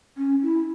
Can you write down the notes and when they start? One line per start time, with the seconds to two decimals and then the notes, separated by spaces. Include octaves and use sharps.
0.17 C#4
0.42 E4